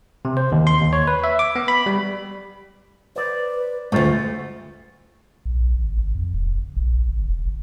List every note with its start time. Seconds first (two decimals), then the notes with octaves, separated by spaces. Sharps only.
0.25 C3
0.37 C5
0.52 D#2
0.67 C6
0.81 D#2
0.93 C#5
1.07 B4
1.24 E5
1.39 D6
1.56 B3
1.68 B5
1.86 G3
3.16 B4 C5 D5
3.92 D2 G#2 A3 F4
5.45 A#1
5.60 A#1
5.74 G#1
5.98 G#1
6.15 F2
6.33 E1
6.46 E1
6.58 F#1
6.77 A#1
7.09 G1
7.28 F1
7.46 G1